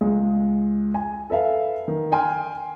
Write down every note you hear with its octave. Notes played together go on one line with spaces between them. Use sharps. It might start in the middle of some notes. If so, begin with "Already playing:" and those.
C#2 G#3
G#5
A4 B4 E5 F5
D#3
G5 G#5 C6 F6